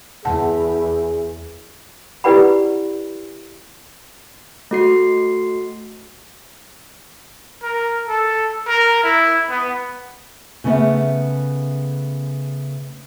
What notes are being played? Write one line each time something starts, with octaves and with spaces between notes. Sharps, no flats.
E2 G#4 F#5 A5
E4 G4 B4 D5 F#5 B5
A3 F#4 C7
A#4
A4
A#4
E4
B3
C#3 A3 B3 E5